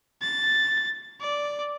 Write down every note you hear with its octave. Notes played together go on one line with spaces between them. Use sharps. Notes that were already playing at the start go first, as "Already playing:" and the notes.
A6
D5